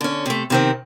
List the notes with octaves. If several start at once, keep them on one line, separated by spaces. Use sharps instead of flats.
D3 C#4
C3 A3
C3 D#3 C4